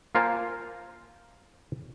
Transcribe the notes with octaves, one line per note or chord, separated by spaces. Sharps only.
A#3 F4 A#4 C5 G#5 A5